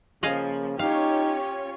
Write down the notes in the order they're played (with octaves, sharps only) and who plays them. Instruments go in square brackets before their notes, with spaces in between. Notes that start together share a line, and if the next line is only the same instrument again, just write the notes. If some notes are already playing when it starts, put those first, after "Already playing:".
[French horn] C#3 [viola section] F3 A#3 [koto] G#4 D#5 F5
[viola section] C#4 F4 C#5 [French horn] D#4 [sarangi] G4 [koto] F5